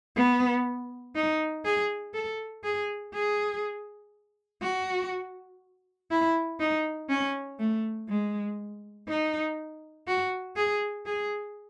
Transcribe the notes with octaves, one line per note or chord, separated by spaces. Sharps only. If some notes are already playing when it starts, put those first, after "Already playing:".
B3
D#4
G#4
A4
G#4
G#4
F#4
E4
D#4
C#4
A3
G#3
D#4
F#4
G#4
G#4